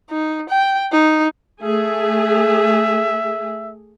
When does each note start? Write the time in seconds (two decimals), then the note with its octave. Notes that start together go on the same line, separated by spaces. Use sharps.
0.10 D#4
0.49 G5
0.92 D#4
1.63 A3 G#4 E5